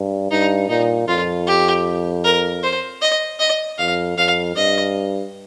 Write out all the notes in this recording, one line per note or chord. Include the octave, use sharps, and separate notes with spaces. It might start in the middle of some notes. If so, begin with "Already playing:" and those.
Already playing: G2
G2 D#4
A#2 D#4
F2 F4
G4
A#4
C5
D#5
D#5
F2 F5
F2 F5
G2 D#5